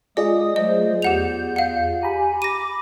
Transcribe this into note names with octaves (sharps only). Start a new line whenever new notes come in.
G#3 F4 G#4 D5 D#5 D#6
F#3 A3 C5 D#5
E2 G4 F#5 G6 F7
F5 F#5
G4 G#5 A#5 B5
D6 A#6 D#7